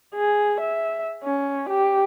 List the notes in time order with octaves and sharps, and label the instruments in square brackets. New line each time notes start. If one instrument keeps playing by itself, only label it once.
[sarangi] G#4
E5
C#4
G4